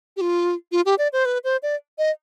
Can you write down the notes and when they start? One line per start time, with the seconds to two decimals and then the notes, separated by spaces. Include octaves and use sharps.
0.17 G4
0.21 F4
0.72 F4
0.85 G4
0.98 D5
1.13 C5
1.25 B4
1.44 C5
1.63 D5
1.98 D#5